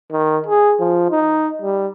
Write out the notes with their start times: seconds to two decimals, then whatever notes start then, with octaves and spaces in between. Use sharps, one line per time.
0.12 D#3
0.47 G#4
0.80 F3
1.11 D#4
1.62 G3